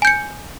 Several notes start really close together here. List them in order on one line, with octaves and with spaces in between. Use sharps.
G#5 G6 C#7